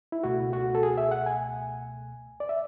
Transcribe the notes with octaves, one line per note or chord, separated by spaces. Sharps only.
E4
C#2 B2 A3 F#4
F#4
A4
G#4
E5
F#5
G#5
D5
E5